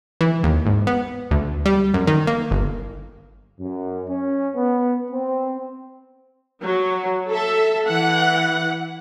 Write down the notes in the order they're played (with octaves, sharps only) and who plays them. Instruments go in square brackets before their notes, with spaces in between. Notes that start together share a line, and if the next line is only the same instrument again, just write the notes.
[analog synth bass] E3
D#2
G#1
B3
D2
G3
F#2
D#3
A#3
G1
[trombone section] F#2
C#4
B3
C4
[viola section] F#3
A4 E5
E3 F#5